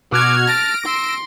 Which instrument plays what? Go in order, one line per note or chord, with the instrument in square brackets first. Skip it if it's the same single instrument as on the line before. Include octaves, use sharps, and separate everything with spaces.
[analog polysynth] B2 F#4 G#6 [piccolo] D6 [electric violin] F6
[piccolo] A5 [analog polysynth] A#6 D7
[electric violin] C6 [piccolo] E6